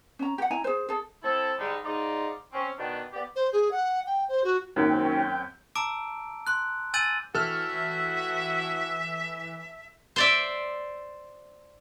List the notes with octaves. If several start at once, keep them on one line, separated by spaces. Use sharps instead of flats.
C#4 A#5
G4 F#5
E4 G#5 A#5
G#4 C5
G#4 A4
C4 E4 A4
G#2 D3 G3 D4 D#4
G#2 D#4 F4 D5
C4 C#4
B2 D#3 B3 D4 G5
B3 G4 D5
C5
G#4
F#5
G5
C5
F#4
F#2 D#3 F#3 A#3 C4 C#4 G5
A5 A#5 D6 E6 D7
C6 F#6
G#5 E6 G6 A6 D#7 F#7
A2 E3 E4 F#4 A4 E5 F6
C5 D5 E5